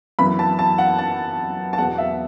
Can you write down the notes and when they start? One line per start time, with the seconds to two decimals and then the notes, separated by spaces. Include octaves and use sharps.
0.19 F#2 E3 B3 B5
0.39 A5
0.59 A5
0.78 F#5
0.98 A5
1.73 A5
1.78 E2 B2 B3 F#5
1.98 E5